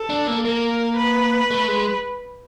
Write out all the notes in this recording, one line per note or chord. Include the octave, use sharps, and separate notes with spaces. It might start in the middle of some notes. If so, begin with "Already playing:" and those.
Already playing: A4
D4
A#3
A#3 A#4
B4
A3
G#3